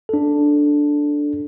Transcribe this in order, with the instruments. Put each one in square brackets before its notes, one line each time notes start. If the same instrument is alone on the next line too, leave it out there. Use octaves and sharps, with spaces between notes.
[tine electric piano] D4 A4